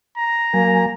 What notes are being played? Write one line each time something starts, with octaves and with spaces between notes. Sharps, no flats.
A#5
F#3 A#3 G#5